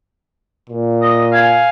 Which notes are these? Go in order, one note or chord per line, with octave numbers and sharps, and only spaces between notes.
A#2
D#5
F5 G#5